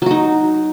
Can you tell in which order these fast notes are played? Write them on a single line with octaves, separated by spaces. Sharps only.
F#3 F#4 D#4